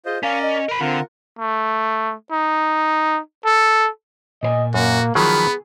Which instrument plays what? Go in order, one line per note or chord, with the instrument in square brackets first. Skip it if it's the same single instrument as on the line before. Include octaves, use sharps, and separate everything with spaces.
[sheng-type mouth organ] F4 C5 D#5 [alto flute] G#4
[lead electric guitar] C#4 [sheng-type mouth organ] A#4 D5 A#5 [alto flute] F5
[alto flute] D#5
[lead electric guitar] A#4 B5
[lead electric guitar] D3 [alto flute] C4 [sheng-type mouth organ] F4 A#4 F#5
[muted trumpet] A3
D#4
A4
[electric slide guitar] A#2 C5 G#5 [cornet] D#5
[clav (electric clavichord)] F#2 [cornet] A#3 [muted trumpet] F#4
[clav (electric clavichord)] D#3 F3 F#3 [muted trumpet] B3 [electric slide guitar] G#4 [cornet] B5